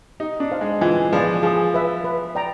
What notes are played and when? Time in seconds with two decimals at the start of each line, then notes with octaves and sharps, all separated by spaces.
0.20 D#4 G4
0.40 D4
0.52 C5 F5
0.61 G#3
0.81 E3 F4
1.12 F3 G#4 B4 D5 F5
1.43 F3 G#4
1.74 B4 E5
2.04 B4
2.35 D5 G5 A#5